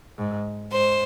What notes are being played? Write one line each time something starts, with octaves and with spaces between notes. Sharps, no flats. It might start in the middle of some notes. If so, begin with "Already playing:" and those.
G#2
G#2 C5